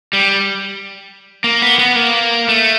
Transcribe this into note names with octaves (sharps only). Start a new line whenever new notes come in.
G3
A#3
B3
B3
A#3
A3